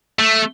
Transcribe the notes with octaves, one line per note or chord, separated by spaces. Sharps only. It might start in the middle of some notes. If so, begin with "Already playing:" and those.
A3